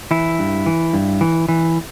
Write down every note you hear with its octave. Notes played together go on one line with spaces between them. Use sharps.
E3 E4
G2
E3
G2
E3
E3